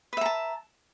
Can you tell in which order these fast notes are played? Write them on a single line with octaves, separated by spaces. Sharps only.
B4 E5 A#5 A5